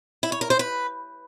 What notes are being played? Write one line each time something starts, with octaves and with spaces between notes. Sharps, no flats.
E4
C#5
A#4
C5
B4